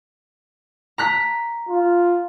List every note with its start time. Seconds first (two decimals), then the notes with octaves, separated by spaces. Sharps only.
0.98 A#5 F#6 B6
1.69 F4